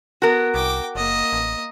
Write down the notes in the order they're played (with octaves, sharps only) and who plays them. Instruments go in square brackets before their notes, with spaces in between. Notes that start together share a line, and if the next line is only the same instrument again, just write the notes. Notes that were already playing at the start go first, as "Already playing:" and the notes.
[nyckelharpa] B3 [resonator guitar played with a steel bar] F#4 A#4
[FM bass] C2 [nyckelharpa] G5 D6
[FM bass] F#1 [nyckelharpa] A#3 D#5
[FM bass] A1